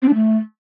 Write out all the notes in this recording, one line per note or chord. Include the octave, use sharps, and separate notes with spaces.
C4
D4
A3